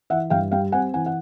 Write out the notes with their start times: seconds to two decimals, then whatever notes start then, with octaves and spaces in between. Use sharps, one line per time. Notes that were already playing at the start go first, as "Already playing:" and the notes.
0.10 E3 E5 F#5
0.30 G2 F5 G5
0.51 G3 F5 G5
0.72 C4 F#5 G#5
0.94 E3 F#5 G#5
1.06 F#5